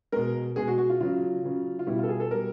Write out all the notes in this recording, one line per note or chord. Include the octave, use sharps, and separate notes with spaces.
B2 G#3 A#4
B2 G#3 G#4
F#4
F#4
F4
C#3 F#3 F4
C#3 F#3
F4
B2 G3 E4
F4 A4
G#4
A4
B2 G3 A#4